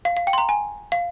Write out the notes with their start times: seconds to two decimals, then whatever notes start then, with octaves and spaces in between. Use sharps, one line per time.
0.05 F5
0.17 F5
0.27 G5
0.33 C6
0.38 A#5
0.49 G#5
0.92 F5